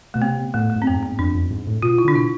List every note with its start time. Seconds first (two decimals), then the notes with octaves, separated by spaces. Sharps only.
0.14 B2 A3
0.22 C3 B3
0.54 A2 A3
0.70 A3
0.76 G#2
0.82 C4
0.87 F2 B3
0.97 G#2
1.03 C4
1.19 F2 D4
1.35 F2
1.51 G#2
1.67 A2
1.82 B2 F4
1.98 E4
2.05 D3 D4
2.15 B2 E4